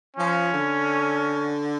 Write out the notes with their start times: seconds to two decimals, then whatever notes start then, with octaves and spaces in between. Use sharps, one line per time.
0.17 F3 C#4
0.51 D3